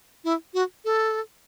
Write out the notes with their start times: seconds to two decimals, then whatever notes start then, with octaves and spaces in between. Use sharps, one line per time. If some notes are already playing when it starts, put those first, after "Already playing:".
0.24 E4
0.54 F#4
0.85 A4